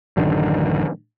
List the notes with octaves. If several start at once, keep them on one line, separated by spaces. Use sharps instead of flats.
A1 F#2 D3 D#3